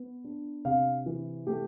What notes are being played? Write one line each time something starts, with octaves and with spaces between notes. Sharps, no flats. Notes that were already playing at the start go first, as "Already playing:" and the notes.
Already playing: B3
D4
C3 F5
E3
A3 G4